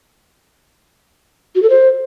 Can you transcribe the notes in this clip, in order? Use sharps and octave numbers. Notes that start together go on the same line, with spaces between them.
F#4
A4
C5